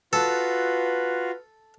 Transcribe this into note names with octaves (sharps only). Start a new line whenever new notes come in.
F4 F#4 A4 B4